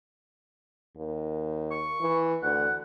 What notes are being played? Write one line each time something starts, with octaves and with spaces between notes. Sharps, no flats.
D#2
C#6
E3
D2 F#5